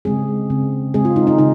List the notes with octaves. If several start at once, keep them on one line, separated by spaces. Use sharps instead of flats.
C#3 G#3 C4 G#4
C#3 G#3 C4
C#3 G#3 C4 G#4
F4
D#4
D#4
C#3 D#4